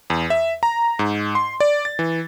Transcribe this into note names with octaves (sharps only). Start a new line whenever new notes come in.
E2
E5
A#5
G#2
C6
D5
A6
E3